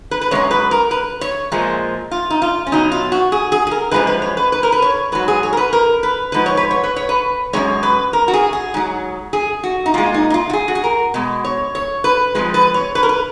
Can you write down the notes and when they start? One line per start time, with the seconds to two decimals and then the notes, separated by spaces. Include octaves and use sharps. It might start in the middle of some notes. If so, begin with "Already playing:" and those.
0.11 B4
0.21 B4
0.31 C#3 G#3 C#5
0.35 F#2
0.51 B4
0.71 A#4
0.91 B4
1.21 C#5
1.52 A#2 F3 G#3
2.11 F4
2.30 D#4
2.42 F4
2.67 C#4
2.72 B2 F#3 D#4
2.92 F4
3.12 F#4
3.32 G#4
3.52 G#4
3.67 G#4
3.71 A#4
3.91 F#2 C#3 F3 G#3 B4
4.07 B4
4.22 C#5
4.37 B4
4.52 B4
4.63 A#4
4.72 B4
4.82 C#5
5.12 G#2 F#3 B4
5.28 G#4
5.43 C#5
5.53 A#4
5.57 B4
5.73 A#4
6.03 B4
6.32 G#2 F3 B4
6.46 C#5
6.57 B4
6.71 C#5
6.84 B4
6.96 C#5
7.09 B4
7.53 F#2 D#3 G#3 C#5
7.83 B4
8.13 A#4
8.28 F#4
8.34 G#4
8.53 G#4
8.74 G#2 F#3
9.33 G#4
9.64 F#4
9.86 D#4
9.94 A#2 G#3 F4
10.14 D#4
10.30 D#4
10.34 F4
10.50 F#4
10.53 G#4
10.68 F#4
10.75 G#4
10.84 A#4
11.14 B2 G#3
11.45 C#5
11.75 C#5
12.04 B4
12.35 F2 F3 G#3 B4
12.54 B4
12.74 C#5
12.95 B4
13.03 A#4
13.09 B4